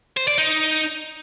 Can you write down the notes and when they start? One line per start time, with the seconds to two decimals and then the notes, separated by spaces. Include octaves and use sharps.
0.17 C5
0.28 D5
0.38 D#4